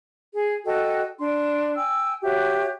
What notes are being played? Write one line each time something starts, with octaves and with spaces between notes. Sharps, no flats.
G#4
F#4 A4 D#5 G5
D4 C6
G5 G#5 E6
F#4 G4 C#5 E5